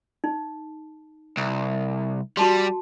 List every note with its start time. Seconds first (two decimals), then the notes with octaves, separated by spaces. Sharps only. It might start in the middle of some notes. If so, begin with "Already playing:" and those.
0.24 D#4
1.37 C2
2.37 G3 F#4 A5 C6